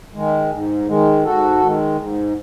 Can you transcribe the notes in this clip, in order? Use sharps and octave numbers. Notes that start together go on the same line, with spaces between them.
D#3 G#3
G#2
D#3 G#3
G#2 F#4 A4
D#3 G#3
G#2